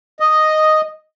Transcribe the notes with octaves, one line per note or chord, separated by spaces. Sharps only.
D#5